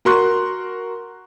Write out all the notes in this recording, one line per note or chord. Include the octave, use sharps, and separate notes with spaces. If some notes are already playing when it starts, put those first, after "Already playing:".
F#4 A#4 C6 C#6 F#6